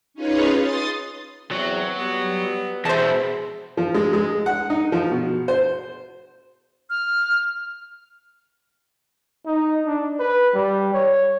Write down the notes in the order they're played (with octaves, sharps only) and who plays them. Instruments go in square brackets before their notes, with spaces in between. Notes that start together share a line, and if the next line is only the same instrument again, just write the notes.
[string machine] C#4 D#4 F4 G#4 B4 C#5
C6 D#6 A6
[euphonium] E2 [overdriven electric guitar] F#3 [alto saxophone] C4
[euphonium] G3 [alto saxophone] B3
[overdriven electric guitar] E2 B2 [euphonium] G#4 [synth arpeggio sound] C5 A5 [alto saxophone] E5
[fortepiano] F3
G#3
G#3
F#5
D#4
F3
B2
C5
[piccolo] F6
[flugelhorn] D#4
D4
B4
G3
C#5